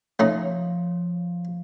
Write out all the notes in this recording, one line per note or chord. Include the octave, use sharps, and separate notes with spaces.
F3 A3 C#4 D#4 C#5